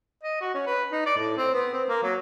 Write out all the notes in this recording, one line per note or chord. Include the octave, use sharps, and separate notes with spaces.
D#5
F#4
C#4
B4
D#4
D5
A2
C4
B3
C4
A#3
F#3